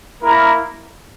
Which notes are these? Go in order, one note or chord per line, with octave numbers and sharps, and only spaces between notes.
A#3 E4 A#4